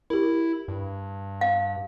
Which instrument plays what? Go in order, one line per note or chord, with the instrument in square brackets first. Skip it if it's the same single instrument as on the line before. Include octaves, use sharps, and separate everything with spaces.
[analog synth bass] E4 [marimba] G4 A#4
[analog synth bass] G2
[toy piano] F5